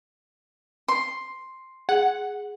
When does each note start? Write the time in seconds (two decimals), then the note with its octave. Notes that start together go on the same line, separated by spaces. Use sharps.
0.88 C6
1.89 G#4 F#5